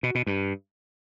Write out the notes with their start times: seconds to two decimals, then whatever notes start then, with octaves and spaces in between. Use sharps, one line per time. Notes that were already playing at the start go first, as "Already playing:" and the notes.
0.03 B2
0.15 B2
0.27 G2